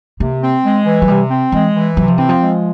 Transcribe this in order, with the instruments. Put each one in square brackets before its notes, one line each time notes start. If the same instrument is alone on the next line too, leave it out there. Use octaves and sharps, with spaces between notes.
[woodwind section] C3 [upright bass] A#3
[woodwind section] C4
G#3
E3
[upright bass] F#3
[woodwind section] C3 [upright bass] G3
[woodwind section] C4
[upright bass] E3 [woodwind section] G#3
[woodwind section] E3
[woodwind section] C3 [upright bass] F#3
[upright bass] F3
[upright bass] E3 [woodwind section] C4
[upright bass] F3
[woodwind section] G#3